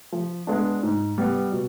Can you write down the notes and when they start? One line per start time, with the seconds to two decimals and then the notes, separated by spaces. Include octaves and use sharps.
0.12 F3
0.47 G#3 B3 D4
0.83 G#2
1.18 G3 B3
1.52 B2